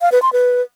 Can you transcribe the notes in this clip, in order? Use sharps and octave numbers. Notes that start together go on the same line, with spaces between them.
F5
B4
C6
B4